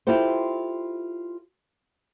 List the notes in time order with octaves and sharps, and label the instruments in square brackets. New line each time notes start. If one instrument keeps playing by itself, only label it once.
[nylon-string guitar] E4 F4 G4 A4 C5